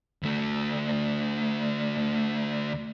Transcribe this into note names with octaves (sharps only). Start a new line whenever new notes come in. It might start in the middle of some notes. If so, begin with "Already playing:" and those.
D2 A3